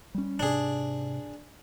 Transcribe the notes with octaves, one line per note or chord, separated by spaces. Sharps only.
G3 C#4
G#2 C3 D4 G#4